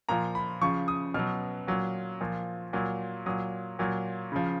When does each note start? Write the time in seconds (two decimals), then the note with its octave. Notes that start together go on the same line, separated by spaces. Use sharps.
0.09 A#2 F3 A#5
0.35 B5
0.62 C#3 F3 C#6
0.88 D#6
1.14 B2 F#3 F6
1.67 A#2 F#3
2.21 A#2 F3
2.73 A#2 F#3
3.26 A#2 F#3 D#6
3.79 A#2 F#3
4.32 C#3 F3